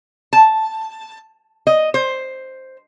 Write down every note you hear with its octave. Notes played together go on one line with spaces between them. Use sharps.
A5
D#5
C5